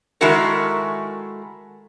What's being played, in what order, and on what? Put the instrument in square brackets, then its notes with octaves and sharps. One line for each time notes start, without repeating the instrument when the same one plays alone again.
[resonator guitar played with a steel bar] D#3 G#3 A3 E4 F#4 A#4